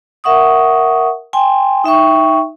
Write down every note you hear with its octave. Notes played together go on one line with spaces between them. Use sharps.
A#4 E5 F#5 C#6 D#6
G5 G#5 C6
D#4 E5 G5 C#6